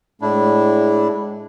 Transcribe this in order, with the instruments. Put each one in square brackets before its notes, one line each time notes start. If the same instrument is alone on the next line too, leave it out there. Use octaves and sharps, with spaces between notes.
[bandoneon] A2 D4 E4 [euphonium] G#3